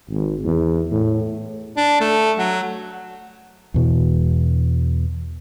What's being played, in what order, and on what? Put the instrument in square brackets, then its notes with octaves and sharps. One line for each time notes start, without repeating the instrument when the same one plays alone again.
[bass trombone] G#1
E2
A2
[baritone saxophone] D4
A3
F#3
[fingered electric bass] E2 B2 E3